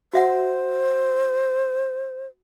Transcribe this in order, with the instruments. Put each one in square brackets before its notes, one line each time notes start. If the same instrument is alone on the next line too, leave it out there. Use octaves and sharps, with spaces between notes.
[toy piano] F#4 E5 F#5 [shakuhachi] C5